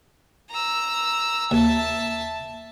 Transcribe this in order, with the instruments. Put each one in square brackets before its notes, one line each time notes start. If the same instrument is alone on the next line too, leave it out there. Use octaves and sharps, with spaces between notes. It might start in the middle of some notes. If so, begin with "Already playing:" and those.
[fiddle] A#5 E6
[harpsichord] D#2 [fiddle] E5 A5